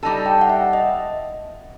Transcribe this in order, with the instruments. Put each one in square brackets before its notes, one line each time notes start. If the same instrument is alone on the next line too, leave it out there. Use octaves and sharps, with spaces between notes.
[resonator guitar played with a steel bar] G3 D#4 A4 [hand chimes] A5
[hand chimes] G5
F#5
E5
D#5